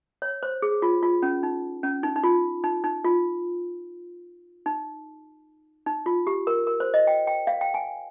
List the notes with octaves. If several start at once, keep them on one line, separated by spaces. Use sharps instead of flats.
C#5
C5
G#4
F4
F4
C#4
D#4
C#4
D#4
D#4
F4
D#4
D#4
F4
D#4
D#4
F4
G4
A#4
A#4
C5
D#5
G5
G5
F5
G5
G#5